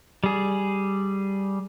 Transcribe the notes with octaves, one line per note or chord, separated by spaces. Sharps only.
G3 G#4